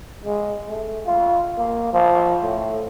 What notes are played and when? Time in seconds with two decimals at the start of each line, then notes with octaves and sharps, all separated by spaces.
0.25 G#3
0.68 A3
1.06 F4
1.58 A#3
1.93 F3
2.43 A2